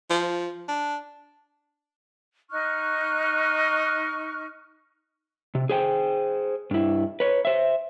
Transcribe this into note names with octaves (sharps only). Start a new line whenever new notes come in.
F3
D4
D#4 C#6 F6 F#6
C3
G#4 C5 G5
G2 E4
B4 C#5
C5 E5